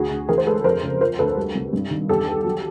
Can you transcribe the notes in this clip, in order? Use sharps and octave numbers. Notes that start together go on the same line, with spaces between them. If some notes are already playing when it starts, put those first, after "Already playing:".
Already playing: D2 F#4 G#4
D2
E3 G#4 A#4
C5
G#3 A4 B4
F2 A#4 C5
C#3
F3 A#4 C5
D2 A4 B4
G3
C2
G2
D#3
E2 G4 A4
B3
F#3